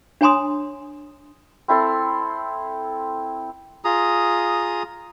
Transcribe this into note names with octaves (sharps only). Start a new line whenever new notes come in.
D4 C#5 G#5 A#5 C6 D#6
C4 E4 A4 C6
F4 G#4 A#5 D#6